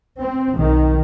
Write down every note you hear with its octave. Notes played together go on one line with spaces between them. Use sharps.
C4
B1 D#3